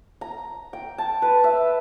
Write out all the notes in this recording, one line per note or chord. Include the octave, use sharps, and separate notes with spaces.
A#5
G5
A5
B4
E5